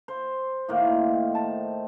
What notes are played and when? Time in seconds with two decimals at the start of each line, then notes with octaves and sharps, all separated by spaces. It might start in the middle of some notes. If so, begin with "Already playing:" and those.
0.08 C5
0.69 A2 D#3 A#3
1.35 A5